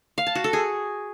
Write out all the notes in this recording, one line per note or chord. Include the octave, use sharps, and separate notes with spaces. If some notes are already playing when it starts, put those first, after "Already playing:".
F5
A5
F#4
A4
G#4